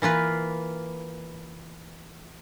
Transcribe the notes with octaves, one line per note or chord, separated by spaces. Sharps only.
E3 A#3 F4 B4